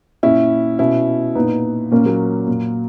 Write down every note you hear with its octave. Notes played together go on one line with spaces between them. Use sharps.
A#2 C#4 E4
B2 C#4 E4
A#2 B3 D#4
A#2 A#3 C#4
F#3 A#3
A#2